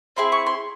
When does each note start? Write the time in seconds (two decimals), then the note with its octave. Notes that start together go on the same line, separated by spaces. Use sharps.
0.17 C4 E4 G#4 C6
0.32 C#6
0.46 C6